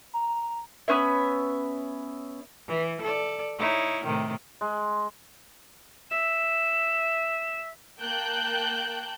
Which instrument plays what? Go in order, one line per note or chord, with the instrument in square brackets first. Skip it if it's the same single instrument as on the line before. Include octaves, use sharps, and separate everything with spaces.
[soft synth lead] A#5
[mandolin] B3 C#4 B4 E5
[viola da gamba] E3
A4 D5
D#4 E4 C#5
A2 C3 D#3
[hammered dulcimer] G#3
[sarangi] E5 [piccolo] E7
[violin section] A#3 G5 A5 F#6 G6